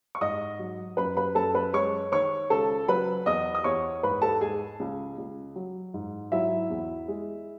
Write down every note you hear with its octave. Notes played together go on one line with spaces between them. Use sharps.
C#6
G#2 D#5 D#6
F#3
F#2 B4 B5
B4 B5
F#2 A4 A5
B4 B5
G#3 C#5 C#6
D#3 C#5 C#6
C#2 A4 A5
F#3 B4 B5
E2 D#5 D#6
D#6
E2 C#5 C#6
G#2 B4 B5
A4 A5
G#3 G#4 G#5
C#2
C#2
F#3
G#2
F#3 E4 E5
E2
G#3